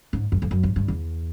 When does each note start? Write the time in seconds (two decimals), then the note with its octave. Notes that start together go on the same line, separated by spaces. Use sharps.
0.13 G#2
0.32 F#2
0.42 F2
0.51 F#2
0.63 G#2
0.76 G2
0.88 E2